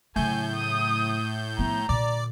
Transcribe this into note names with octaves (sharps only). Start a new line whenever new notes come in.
A2 C#3 F#3 G#5 G6
D#6
F3 B3 A#5
A#2 D3 D5